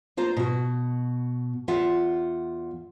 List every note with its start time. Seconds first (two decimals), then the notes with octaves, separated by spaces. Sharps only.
0.17 A#3 F4 C5 A#5
0.37 B2 F#4
1.68 E2 F4 E5 F#5